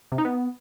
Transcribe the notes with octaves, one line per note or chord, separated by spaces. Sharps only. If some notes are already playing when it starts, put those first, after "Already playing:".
C3
D#4
B3